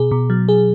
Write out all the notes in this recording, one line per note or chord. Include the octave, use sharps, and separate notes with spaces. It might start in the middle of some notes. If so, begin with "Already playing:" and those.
Already playing: B2 G#4
B2
F#3
G#4